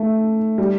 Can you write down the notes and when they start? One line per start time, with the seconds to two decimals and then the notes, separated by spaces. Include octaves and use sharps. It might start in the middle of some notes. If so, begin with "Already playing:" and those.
Already playing: A3
0.58 G3